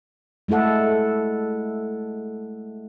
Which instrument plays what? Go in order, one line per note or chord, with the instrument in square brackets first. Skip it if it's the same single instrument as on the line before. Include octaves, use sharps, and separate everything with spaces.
[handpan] G#3 A3 E4 A4 F#5